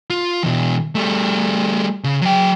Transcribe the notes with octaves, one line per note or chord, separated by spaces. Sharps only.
F4
B2 E3
G3 A3
C#3
F#3 G5